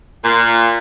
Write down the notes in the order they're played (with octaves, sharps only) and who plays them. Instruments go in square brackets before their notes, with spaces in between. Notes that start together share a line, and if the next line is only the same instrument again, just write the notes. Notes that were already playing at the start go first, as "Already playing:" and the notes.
[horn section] A#2